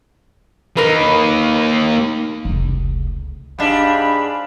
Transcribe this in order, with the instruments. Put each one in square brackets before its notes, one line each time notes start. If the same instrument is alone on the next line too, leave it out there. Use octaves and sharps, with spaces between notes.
[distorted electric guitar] A#3 D#4 [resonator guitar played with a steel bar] A#4 B4
[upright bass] F1 C#2
[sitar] G#2 D4 [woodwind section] G4 F5 B5